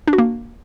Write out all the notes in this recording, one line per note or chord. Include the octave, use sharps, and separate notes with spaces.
D4
F#4
A#3